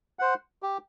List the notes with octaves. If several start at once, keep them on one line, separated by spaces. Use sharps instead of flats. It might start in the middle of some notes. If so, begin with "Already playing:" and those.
C5 F#5
G4